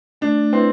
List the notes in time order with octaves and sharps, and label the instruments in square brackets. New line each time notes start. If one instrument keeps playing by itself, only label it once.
[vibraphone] A3 [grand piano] D4
[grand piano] C4 [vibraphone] E4 B4 E5